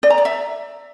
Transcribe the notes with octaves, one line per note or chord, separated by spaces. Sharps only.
D5
A#5
D5
E5